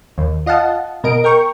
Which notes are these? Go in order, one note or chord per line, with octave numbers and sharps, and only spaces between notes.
D#2
F4 D#5 F5 F#5 A5
B2 A#4 D#5 D7
A#4 G5 C#6